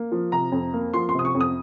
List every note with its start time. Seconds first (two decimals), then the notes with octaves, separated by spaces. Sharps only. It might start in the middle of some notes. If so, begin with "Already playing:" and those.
Already playing: A#3
0.12 F3
0.32 C3 A#5
0.52 F2
0.73 A#3
0.94 F3 C6
1.09 C6
1.15 C3 D#6
1.25 C#6
1.35 F2
1.41 D#6